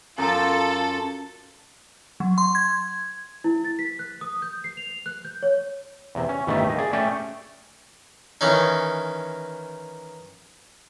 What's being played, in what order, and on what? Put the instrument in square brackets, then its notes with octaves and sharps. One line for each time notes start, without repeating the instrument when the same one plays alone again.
[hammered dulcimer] F#2 [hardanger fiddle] F4 [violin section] A4
[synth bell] F#3
C6
G#6
[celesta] E4
A6
B6
F#6
D#6
G6
C7
F7
F#6
G6
C#5
[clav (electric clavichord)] E2 C3
C#4
G1 A2 D#3 A3 G4
D#2 D#5
G#4 D5
A3 C#4 A4 D5 G5
[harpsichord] D#3 E3 C#4 D#4